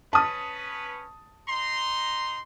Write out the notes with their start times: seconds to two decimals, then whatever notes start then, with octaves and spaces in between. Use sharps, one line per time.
0.13 C#4 B4 A5 D#6
1.47 D#4 A#5 C6